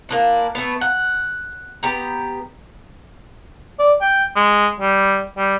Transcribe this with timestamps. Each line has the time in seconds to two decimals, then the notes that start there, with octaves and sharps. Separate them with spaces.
0.09 A#3 D4 E4
0.55 A3 B3
0.81 F#5
1.83 B3 G4 A#5
3.79 D5
4.01 G5
4.36 G#3
4.80 G3
5.37 G3